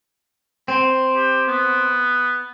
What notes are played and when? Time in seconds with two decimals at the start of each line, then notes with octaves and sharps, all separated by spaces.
0.68 C4
1.15 G4
1.48 B3